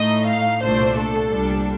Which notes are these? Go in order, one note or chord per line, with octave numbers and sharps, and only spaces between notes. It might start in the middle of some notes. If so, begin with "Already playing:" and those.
Already playing: A2 A3 D#4 D#5
F5
C2 A#2 A3 D4 C5
A4
C2 A#2 G3 D4